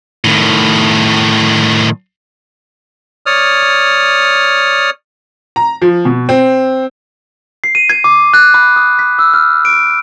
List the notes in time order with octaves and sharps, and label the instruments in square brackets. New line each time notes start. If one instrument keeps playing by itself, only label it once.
[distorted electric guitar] A2 D#3
[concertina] C#5 D5 D#6 F6
[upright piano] A#5
F3
B2
C4
[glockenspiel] C7
D#7
G#6
D6
F#6
B5
D#6
B6
E6
F6
D7